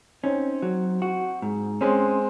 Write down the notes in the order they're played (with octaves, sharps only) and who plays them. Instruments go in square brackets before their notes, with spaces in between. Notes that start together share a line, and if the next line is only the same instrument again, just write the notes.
[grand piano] C4 D#4 [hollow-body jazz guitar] C#4
[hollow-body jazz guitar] F#3
F#4
G#2
[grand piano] G#3 C4 [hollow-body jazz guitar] C#4